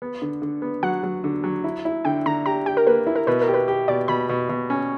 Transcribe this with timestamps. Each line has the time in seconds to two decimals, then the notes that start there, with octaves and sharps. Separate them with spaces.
0.02 B3
0.22 D3
0.42 D3
0.62 B3
0.83 F#3 F#5
1.03 F#3
1.24 D3
1.44 F#3
1.64 E4
1.85 E4
2.05 D3 G5
2.26 D3 A#5
2.46 G4 A#5
2.66 G4 G5
2.77 A#4
2.87 A#3 B4
3.07 E4
3.16 A#4
3.27 B2 B4
3.41 A#4
3.48 G4
3.54 B4
3.68 G4
3.88 B2 D5
4.08 B2 B5
4.29 B2
4.49 B2
4.70 C#4